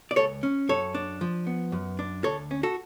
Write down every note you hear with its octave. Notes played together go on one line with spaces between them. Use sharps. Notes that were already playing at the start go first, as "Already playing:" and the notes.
D5
C#2 A4 C#5
C#4
F#2 A4 C#5
D4
F3
B3
F#2
D4
D2 A4 C#5
C#4
F#4 A4